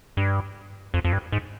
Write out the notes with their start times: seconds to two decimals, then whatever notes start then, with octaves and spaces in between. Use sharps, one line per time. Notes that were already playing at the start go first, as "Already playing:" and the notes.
0.17 G2
0.94 F2
1.05 F2
1.13 G2
1.32 G#2